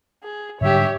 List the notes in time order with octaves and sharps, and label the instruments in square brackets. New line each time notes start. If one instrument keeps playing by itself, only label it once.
[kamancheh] G#4
[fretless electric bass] G#2 D3 G3 [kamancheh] G4 C#5 [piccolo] E5